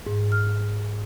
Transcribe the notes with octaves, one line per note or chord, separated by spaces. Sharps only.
G#2
F6